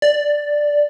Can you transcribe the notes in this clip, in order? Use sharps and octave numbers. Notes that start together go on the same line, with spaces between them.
D5